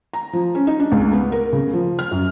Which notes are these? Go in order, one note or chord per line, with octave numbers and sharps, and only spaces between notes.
A#5
F3
C#4
D#4
D4
C#2
B3
A#4
C#3
F3
F6
F#2